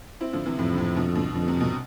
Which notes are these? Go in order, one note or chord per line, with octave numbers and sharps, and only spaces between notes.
C4 E4
D3 F3
C3 E3
F2 A2 C3
D3
A2 C3
B2 D3
B2 D3
F2 D3
C3
B2